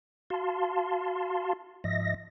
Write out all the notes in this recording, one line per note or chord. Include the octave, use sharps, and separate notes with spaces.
F#4 F5 A5 C6
G#2 F3 D#5 E5 A#6